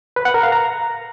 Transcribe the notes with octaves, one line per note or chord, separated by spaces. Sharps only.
B4
F#5
A#4
F5
A#5